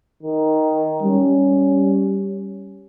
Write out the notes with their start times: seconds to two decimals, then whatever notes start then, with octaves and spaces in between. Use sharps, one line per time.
0.23 D#3
1.02 G3 C#4